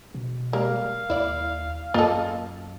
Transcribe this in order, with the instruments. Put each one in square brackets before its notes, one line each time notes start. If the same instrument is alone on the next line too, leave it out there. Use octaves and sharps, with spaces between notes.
[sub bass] B2
[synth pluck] G3 G#3 [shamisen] A#3 [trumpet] F5
[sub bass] D#2 [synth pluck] E4 D5
[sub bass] F#2 [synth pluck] A#3 D#5 [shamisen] F4 A4